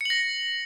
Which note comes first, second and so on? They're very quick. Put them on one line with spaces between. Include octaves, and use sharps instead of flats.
C#7 F#7 A#6